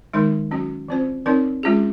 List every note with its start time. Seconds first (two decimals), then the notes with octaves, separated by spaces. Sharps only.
0.13 D#3 G#3 D#4 A#4
0.51 F#3 C#4 F#4
0.88 F3 C4 F4 C5
1.26 F3 C4 D#4 A#4 C#5
1.63 G#3 C#4 F4 G#4